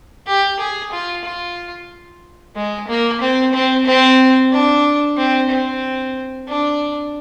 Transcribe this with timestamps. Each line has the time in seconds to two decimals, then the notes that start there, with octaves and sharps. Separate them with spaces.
0.27 G4
0.59 G#4
0.92 F4
1.25 F4
2.56 G#3
2.88 A#3
3.21 C4
3.54 C4
3.87 C4
4.52 D4
5.17 C4
5.50 C4
6.48 D4